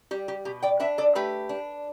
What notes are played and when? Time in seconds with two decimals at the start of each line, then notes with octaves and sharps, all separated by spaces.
0.11 G3 G4
0.28 G4
0.45 B2 G4
0.62 D5 G5
0.80 D4 B4 E5
0.98 A4 D5
1.15 A3 G4 B4
1.49 D4